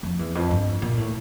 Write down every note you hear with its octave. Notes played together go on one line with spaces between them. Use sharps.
F2
E2
F2
G2
A#2
A2